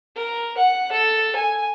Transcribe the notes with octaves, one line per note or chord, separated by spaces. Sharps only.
A#4
F#5
A4
G#5